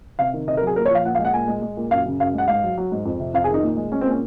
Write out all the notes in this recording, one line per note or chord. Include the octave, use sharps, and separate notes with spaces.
C3 F5
D#3
C3 D#5
A#4
F#3
G#4
A#2 A#4
C#5
F3 F5
A#2 F#5
F5
G#3
F#5
A#2 G#5
G#3
G#3
A#2
F#2 F5
C#3
F#2 F5
G#3 F#5
G#2 F5
F#3
F#3
G#2
F2
C3
F2 F5
G#4
D#3
D#4
A#2
G#3
G#3 C#4
C4
A#2 C#4